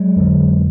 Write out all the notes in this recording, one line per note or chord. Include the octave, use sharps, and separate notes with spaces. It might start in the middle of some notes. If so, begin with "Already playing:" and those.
Already playing: F#3 G#3
F2 D3